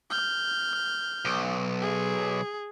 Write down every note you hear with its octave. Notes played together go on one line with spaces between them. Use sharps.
F6 G6
B1
G#4